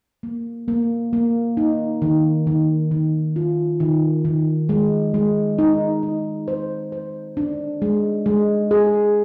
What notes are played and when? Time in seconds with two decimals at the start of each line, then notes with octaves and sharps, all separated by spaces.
0.23 A#3
0.68 A#3
1.13 A#3
1.57 D#4
2.02 D#3
2.47 D#3
2.91 D#3
3.36 F4
3.80 D#3
4.25 D#3
4.69 G#3
5.14 G#3
5.59 D#4
6.03 D#4
6.48 C5
6.92 C5
7.37 D4
7.82 G#3
8.26 G#3
8.71 G#4